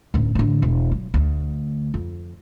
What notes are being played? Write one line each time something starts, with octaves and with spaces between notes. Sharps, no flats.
D1 F#2
A1 D3
E1
F#3
D2
F2